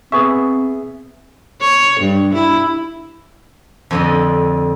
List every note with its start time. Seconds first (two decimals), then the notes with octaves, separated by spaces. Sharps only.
0.12 B3 C4 G#4 E5 C#6 D#6
1.60 C#5
2.00 G2
2.34 E4
3.91 F2 D3 D#5